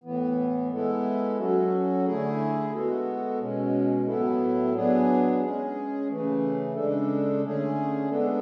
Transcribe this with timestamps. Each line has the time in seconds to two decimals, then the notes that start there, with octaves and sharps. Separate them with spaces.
0.04 A2 E3 B3
0.71 G#3 B3 E4 A4
1.38 F#3 C#4 F#4 A4
2.06 D3 A3 E4 G#4
2.72 G#3 B3 F#4 A4
3.40 B2 G#3 C#4
4.07 A2 F#3 B3 E4 A4
4.74 F#3 B3 D4 G#4
5.40 G#3 C#4 G#4
6.08 C#3 E3 A3
6.75 C#3 G#3 D4 A4
7.42 D3 A3 C#4 G#4
8.09 G#3 B3 D4 A4